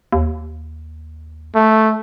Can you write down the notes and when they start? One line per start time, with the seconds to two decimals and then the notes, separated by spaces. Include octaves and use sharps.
0.13 D#2
1.55 A3